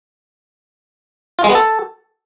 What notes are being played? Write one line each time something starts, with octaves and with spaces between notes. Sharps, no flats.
F4
G#3
B3
A4